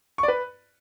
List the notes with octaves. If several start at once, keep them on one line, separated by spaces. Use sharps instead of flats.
C#6
D5
B4